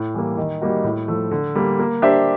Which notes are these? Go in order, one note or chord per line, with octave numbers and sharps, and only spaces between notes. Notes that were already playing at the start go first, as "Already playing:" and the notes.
Already playing: A2
E3 G3 A#3
D#3
G3 A#3 D#4 F#4
A2
F3 A3
D3
G3 A#3
A#3
D4 G4 C5 E5